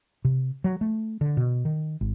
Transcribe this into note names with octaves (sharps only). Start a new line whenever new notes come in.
C3
F#3
A3
D3
B2
D#3
G#1